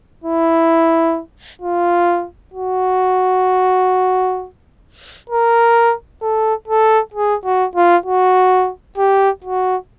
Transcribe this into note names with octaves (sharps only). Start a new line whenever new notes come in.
E4
F4
F#4
A#4
A4
A4
G#4
F#4
F4
F#4
G4
F#4